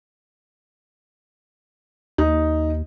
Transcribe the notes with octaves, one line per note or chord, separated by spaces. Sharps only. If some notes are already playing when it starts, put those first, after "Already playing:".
D#2 D#4